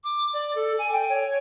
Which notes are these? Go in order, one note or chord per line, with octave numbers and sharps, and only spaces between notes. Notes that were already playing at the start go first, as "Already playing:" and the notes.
D6
D5
A4
G#5
G5
C#5